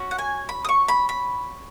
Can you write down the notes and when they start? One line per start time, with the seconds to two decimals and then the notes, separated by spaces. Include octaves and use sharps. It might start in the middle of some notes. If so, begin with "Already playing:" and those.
Already playing: C#4 F#4
0.11 F#5
0.19 G#5
0.49 B5
0.65 D#6
0.69 C#6
0.88 B5
1.09 B5